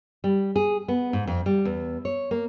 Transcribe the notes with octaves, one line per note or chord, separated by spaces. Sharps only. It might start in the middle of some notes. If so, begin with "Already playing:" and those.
G3
G#4
B3
G#2
F2
G3
E2
C#5
A#3